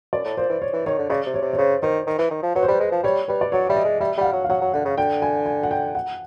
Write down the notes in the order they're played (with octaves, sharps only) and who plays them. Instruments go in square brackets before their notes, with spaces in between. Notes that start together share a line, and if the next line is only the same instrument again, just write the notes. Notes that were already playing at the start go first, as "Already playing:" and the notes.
[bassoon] F#2 [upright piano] D5
[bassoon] A2
[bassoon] A#2 [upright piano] C5
[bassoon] E3
[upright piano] C#5
[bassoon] E3
[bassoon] D#3 [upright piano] C#5
[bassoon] D3
[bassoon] C#3 [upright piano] D5
[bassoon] C3
[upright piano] C#5
[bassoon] C3
[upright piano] C#5
[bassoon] C#3 [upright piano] C5
[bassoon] D#3 [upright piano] C5
[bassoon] D#3
E3
D#3
F3
[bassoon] F#3 [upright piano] B4
[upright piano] C5
[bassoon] G3 [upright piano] B4
[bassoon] G#3
F3
[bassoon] G3 [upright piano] C#5
[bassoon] G3 [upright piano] B4
[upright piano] D5
[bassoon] F#3 [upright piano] C#5
[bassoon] G3 [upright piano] E5
[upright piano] D#5
[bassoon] G#3
[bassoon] G3 [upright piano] E5
[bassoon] G3 [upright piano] F#5
[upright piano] F5
[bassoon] F#3
[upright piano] F5
[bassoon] F#3 [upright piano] F#5
[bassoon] F#3
[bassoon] D3 [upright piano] F#5
[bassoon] C#3
[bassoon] D3 [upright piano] G5
[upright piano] G#5
G#5
F#5
G5
F#5